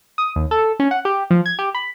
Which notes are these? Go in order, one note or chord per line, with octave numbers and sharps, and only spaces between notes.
D#6
D#2
A4
C#4
F#5
G4
F3
G#6
G4
B5